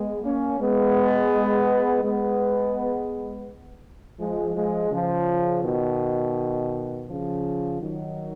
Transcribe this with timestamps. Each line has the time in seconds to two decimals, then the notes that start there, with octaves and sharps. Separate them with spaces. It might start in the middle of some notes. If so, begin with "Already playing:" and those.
Already playing: G#3 B3
0.24 A#3 C#4
0.59 G#3 B3
2.03 G#3 B3
4.20 F3 G#3
4.55 F3 G#3
4.91 C#3 F3
5.63 B2 D#3
7.07 C#3 F3
7.79 D#3 F#3